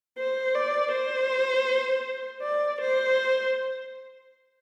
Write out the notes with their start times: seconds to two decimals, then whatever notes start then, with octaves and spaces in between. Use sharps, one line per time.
0.18 C5
0.55 D5
0.92 C5
2.42 D5
2.80 C5